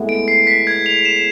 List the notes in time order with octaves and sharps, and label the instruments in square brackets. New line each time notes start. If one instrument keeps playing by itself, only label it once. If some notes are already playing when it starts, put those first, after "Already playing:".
Already playing: [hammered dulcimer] A2 G#3 B3
[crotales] D7
C7
B6
G#6
F7
E7